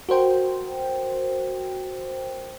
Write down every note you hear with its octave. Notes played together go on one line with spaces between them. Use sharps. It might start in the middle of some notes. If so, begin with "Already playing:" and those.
F#4 A#4 C5 G5